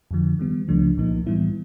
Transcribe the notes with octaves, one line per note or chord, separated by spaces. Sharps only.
F2 D3 F3
D#3 G3 B3
C#2 C#3 F3 A3 D4
C2 A#2 F3 A#3 D#4
A2 E3 G3 B3 E4